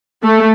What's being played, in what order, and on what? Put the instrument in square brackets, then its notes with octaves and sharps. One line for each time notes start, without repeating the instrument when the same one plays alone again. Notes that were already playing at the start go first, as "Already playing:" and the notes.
[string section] A3